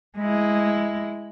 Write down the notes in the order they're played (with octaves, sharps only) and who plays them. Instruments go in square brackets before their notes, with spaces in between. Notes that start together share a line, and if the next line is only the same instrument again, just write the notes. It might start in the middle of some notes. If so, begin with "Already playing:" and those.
[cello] G#3 E4